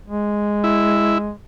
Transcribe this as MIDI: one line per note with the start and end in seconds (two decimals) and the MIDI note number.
0.07 1.31 56
0.64 1.18 64